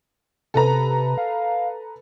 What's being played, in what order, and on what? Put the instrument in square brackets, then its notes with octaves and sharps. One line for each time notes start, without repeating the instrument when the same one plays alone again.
[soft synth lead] C3 [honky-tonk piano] A4 B4 A#5
[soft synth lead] F5